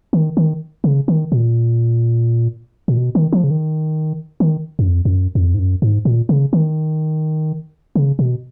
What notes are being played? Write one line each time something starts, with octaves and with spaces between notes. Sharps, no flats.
D#3
D#3
C#3
D#3
A#2
A#2
B2
D#3
F3
C#3
D#3
D#3
F#2
F2
F2
F#2
F2
G#2
F#2
G#2
A#2
C#3
D#3
C#3
B2